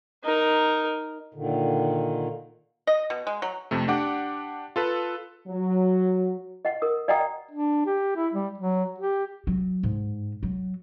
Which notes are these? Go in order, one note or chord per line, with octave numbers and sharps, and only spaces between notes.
D#4 A#4
A#2 D3 D#3
D#5
B2
G#3
F#3
F2 C3 A3
D4 G4 F#5 D6
F4 A4 B4
F#3
D#5 F#5
A#4 D#6
D5 D#5 F#5 G5 A#5 D#6
D4
G4
E4
G3
F#3
G4
F#3
G#2
F#3